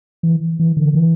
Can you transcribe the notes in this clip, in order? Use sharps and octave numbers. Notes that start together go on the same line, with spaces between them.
E3
E3
D3
E3